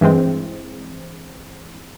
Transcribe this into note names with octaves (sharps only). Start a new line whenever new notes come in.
G2 E3 G#3 C4